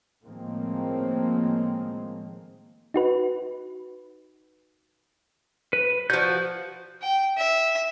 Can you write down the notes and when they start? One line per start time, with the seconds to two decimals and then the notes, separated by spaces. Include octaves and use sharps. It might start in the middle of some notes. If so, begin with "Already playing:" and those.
0.23 A2 D#3 F3 G#3 A#3 C4
2.94 D#4 F#4 B4
5.73 B4
6.10 F3 F#4 G6
7.02 G5
7.37 E5